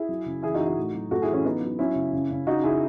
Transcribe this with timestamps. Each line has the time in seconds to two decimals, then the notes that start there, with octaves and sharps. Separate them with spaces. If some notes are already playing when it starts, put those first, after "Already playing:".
Already playing: E4 G#4
0.09 F#3
0.26 C#3
0.43 E3 E4 G#4
0.54 D#4 F#4
0.60 E3
0.66 D#4 F#4
0.78 A2
0.94 F#3
1.11 A2 F#4 A4
1.22 E4 G#4
1.28 E3
1.33 C#4 E4
1.44 F#3 B3 D#4
1.62 F#3
1.79 F#3 C#4 E4
1.96 C#3
2.13 C#3
2.30 C#3
2.47 C#3 D#4 F#4
2.64 C#3 E4 G#4